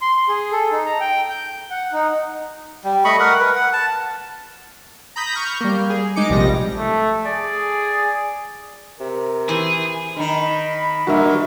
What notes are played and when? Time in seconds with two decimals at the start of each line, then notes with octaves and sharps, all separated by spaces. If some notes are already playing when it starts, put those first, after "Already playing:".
0.02 C6
0.28 G#4
0.52 A4
0.72 D#4
0.86 A#5
1.00 G5
1.30 G6
1.70 F#5
1.93 D#4
2.84 G3
3.05 A3 D#5 B5 C#6
3.20 A#4 F#5
3.41 A#4 B4
3.55 F#5
3.73 A5
5.16 A#5 B5 D#6 G6 B6
5.34 C#6 F6 G6
5.61 G3 A#3
5.90 G#4
6.16 G#3 D#4 D6 C#7
6.30 A#1 C3 F3 G3 A#6
6.77 A3
7.25 G#4 D5
9.00 C3 A#4
9.49 E3 G#4 C5
10.16 D#3 D#4 B5
11.07 G2 A#2 F#4 A#4 E5